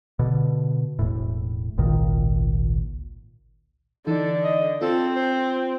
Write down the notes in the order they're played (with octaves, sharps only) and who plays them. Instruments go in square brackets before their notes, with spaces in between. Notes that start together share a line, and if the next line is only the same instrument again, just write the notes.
[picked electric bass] B2 D3
E1 A2
G#1 C#2 A#2 D#3
[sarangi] D3 [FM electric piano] E3 D#4 [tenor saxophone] A4
[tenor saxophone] D#5
[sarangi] C4 [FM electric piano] F4 [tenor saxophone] A4
[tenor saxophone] C5